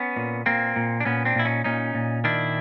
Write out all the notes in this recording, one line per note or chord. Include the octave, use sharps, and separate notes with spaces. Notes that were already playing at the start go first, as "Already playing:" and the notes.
Already playing: B3 C#4
A#2
A#2 A#3 C4
A#2
D4
A#2 B3 C#4
C4 D4
A#2 E4
C#4 D#4
A#2 C#4 D#4
A#2
D#3 D4 E4